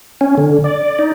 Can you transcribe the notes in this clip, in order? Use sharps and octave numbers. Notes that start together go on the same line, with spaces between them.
C#4
D3
D5
D#4